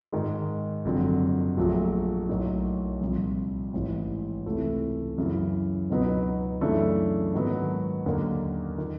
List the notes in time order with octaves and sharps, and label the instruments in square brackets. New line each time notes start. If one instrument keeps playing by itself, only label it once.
[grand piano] G#2 D#3 G#3
F#1 F2 D3 F#3
A#1 A#2 F#3 A3
B1 A2 F#3 A#3 D#4
C2 A#2 F3
A1 G#2 E3
C#2 C3 E3 A3
F#2 C#3 E3
C#2 B2 F#3 B3 D#4
F#2 C#3 E3 A3 D4
G#2 D#3 F#3 B3
D#2 D3 F#3 A#3 C#4
D#3